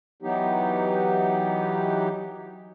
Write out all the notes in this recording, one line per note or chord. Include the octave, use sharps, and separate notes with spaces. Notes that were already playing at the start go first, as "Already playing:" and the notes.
E3 F#3 B3 D#4 G4